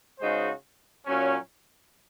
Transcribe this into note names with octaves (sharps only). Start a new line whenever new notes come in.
C#3 G#3 D#4 F#4 C5
A#2 F#3 C#4